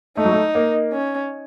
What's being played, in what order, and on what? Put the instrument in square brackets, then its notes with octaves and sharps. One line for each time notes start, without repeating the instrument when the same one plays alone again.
[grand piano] A3 [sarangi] D#4
[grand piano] F#3
A3
A#3
[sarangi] C#4